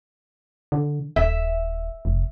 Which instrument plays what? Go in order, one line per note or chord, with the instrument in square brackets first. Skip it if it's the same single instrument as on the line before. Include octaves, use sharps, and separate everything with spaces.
[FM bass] D3
[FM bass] D#1 [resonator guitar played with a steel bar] E5
[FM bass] F1